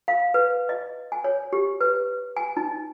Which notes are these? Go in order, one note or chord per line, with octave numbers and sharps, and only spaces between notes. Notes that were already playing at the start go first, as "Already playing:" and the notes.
F5
B4
D#5
G#5
C#5
G4
B4
G#5
D#4